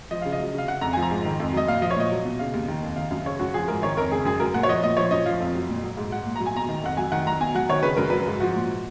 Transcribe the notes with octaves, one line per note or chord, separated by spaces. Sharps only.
F3 D#5
C#3 F5
D#5
F#3
C#3 F5
C#3 F#5
F2 A#5
F3 G#5
A#5
G#2
D#3
F2
F#3 D#5
A#2 F5
F3 D#5
C#5
A#2 D#5
F#3
B2
C#3 F5
D#2
D#3
F2
D#3 F5
F#2 F5
C#3 C#5
F#2 F#4
F3 G#4
G#2 A#4
D#3 C#5
F2 A#4
C#3 G#4
F#2 G#4
F#3 A#4
A#2 F#5
C#5
F3 D#5
A#2 D#5
F3 C#5
F#2 D#5
F3 F5
F2
F#3
A#2
F#3
G#2
F#3 F#5
A#2
F#3 A#5
G#5
B2 A#5
D#3
F2 F#5
F#3 G#5
D#3 F#5
F#3 A#5
B2 G#5
F#3 F#5
D#3 C#5
C#3 B4
F#2 A#4
F#3 B4
G#2
F3 F#4
A#2